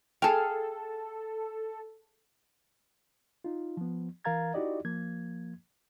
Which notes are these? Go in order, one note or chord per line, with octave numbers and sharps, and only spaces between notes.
G#4 A4 F5 G5 A5
D#4 F4
F3 B3
E3 A#4 F5 A#5 G#6 A6
D#4 E4 F#4 G4 D5 D#5
F3 A#3 G#6